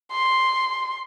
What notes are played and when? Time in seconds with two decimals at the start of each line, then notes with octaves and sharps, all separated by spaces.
0.12 C6